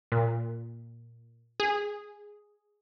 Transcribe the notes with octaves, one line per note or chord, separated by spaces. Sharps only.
A#2
G#4